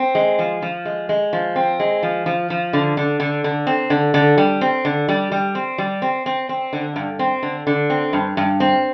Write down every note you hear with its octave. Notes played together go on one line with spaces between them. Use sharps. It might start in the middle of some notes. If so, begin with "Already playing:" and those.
Already playing: C4
G#3
F3
F3
G#3
G#3
F3
C4
G#3
F3
F3
F3
D3
D3
D3
D3
C4
D3
D3
G3
C4
D3
G3
G3
C4
G3
C4
C4
C4
D3
G2
C4
D3
D3
C4
G2
G2
C4